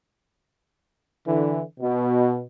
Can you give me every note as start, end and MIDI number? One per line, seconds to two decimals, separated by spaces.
1.26 1.62 50
1.26 1.62 52
1.79 2.43 47